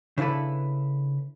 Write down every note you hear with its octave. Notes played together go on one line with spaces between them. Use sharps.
C#3 D4 E4 A4 B4